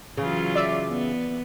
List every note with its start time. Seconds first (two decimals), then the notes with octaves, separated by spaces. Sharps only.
0.17 C#3 E3 F#3 F4
0.56 D5 E5
0.90 B3